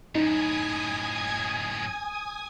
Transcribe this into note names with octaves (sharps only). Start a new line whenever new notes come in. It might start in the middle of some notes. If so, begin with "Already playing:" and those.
F#2 A2 D#4 G#5 D#6 G#6